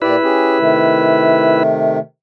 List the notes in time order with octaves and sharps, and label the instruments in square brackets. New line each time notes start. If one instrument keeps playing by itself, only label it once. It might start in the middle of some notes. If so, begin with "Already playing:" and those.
[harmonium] A#2 G4 D5 [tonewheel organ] E4 B4
[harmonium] C#4 G4 G#4
C3 D#3 A3